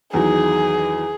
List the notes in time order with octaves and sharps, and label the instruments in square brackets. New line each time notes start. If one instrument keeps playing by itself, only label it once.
[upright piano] E2 D#3 F#3 [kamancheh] G#4